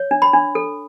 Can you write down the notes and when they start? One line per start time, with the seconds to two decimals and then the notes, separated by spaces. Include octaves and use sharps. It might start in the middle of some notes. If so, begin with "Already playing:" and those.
Already playing: C#5
0.11 D4
0.22 B5
0.33 D4
0.55 A4